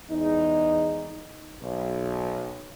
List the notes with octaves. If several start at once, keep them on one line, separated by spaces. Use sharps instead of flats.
E2 G#3 D#4
B1